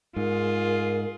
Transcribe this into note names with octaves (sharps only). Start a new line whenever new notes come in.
G#2 F4 G#4 A#4